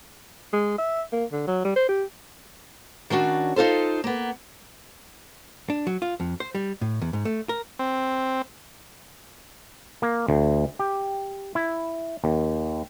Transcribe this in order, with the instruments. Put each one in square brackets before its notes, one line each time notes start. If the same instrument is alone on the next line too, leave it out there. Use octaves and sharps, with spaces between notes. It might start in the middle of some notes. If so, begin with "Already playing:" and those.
[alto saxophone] G#3
E5
A#3
D3
F#3
G3
C5
G4
[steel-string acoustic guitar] D#3 C#4 D4 F#4
D#4 F4 A4 C5
A#3 B3
[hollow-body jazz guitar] D4
F#3
F4
F2
C5
G3
A2
E2
G#2
A3
A#4
[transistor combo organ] C4
[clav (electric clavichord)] A#3
D2
G4
E4
D#2